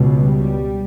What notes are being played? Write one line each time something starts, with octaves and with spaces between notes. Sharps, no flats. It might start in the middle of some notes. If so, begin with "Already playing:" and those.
Already playing: C#2 B2
G3